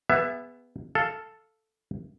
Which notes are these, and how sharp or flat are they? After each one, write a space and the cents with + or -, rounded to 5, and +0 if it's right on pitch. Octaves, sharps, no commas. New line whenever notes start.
B3 +0 G#4 -30 E5 +20
A4 +0 F5 +0